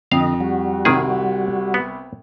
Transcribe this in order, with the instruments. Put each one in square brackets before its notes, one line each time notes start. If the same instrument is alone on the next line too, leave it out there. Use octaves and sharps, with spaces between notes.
[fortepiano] F2 [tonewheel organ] D3 D#5 [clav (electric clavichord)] F5
[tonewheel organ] G3 F#4
[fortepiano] C2 C4 [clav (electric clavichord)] D#3 G#4
[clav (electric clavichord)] B3